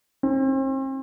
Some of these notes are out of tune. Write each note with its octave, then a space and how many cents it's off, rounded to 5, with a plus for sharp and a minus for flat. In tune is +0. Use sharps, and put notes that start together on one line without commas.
C4 +40